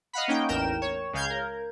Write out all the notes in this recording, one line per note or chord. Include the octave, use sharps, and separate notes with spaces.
D#5 F5 F#5 B5
A#3 C#4 D#4 G5
A1 E2 A#4 G5 E7
C#5
C#2 C#3 F5 G6 G#6
A#4